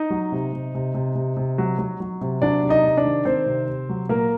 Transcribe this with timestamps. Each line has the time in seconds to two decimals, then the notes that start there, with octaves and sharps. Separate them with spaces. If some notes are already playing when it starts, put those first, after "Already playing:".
Already playing: D#4 D#5
0.10 F#3
0.32 C3
0.53 C3
0.75 C3
0.94 C3
1.15 C3
1.37 C3
1.58 F#3
1.79 F#3
2.00 F#3
2.21 C3
2.42 F#3 D4 D5
2.63 C3
2.69 D#4 D#5
2.84 C3
2.97 D4 D5
3.05 D#3
3.25 D#3 C4 C5
3.46 C3
3.68 C3
3.89 F#3
4.09 A#2 A#3 A#4